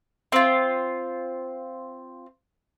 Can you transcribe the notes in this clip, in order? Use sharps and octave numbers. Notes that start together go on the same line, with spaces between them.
C4 F4